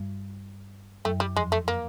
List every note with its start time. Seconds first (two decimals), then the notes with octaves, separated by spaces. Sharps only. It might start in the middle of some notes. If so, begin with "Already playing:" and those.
Already playing: G2 G3
1.05 F#2 F#3 A3
1.20 G3
1.36 F2 F3 G#3
1.52 A3
1.68 A#3